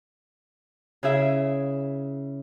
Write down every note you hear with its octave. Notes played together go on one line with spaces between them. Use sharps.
C#3 E4 G#4 E5